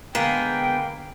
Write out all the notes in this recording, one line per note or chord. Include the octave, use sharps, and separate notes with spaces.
D3 G#3 A#3 B3 G#4 G5